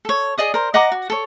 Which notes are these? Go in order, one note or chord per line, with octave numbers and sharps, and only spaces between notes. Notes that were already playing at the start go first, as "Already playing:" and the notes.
A4 C#5
G#4 D5 D#5 D#6
A#4 C5
D#5 F#5 A#5 D6
F#4
A4 C#5